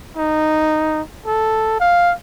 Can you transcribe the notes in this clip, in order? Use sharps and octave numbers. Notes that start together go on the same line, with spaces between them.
D#4
A4
F5